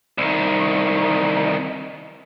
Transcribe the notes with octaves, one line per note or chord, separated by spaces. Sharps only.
C2 D#3